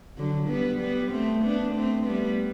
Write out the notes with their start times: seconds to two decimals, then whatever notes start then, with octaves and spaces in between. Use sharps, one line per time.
0.18 D3 F#3
0.49 G3 B3
0.80 G3 B3
1.12 A3 C4
1.44 B3 D4
1.75 A3 C4
2.06 G3 B3